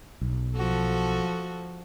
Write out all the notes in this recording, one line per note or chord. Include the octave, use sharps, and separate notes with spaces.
B1
F3 F#4 A4